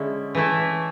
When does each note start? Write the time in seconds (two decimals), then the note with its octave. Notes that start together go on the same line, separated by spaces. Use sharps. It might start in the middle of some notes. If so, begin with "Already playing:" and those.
Already playing: D3 G#3 C#4 E4
0.35 E3 A3 E4